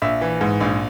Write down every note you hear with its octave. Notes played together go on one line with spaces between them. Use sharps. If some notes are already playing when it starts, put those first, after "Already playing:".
A#1 E5
E3
G#2
A#1